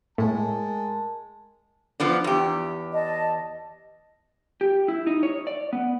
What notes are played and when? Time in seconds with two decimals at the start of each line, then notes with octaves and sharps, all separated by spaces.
0.18 A2 G#3 A#4 A5
2.00 F3 B3 D4
2.24 E2 G4
2.93 D#5 A5
4.61 G4
4.88 E4
5.07 D#4
5.23 C#5
5.47 D5
5.73 B3